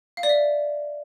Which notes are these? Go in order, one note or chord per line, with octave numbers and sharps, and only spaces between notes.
F5
D5
E5